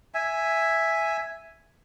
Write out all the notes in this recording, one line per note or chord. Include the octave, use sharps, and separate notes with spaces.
E5 G#5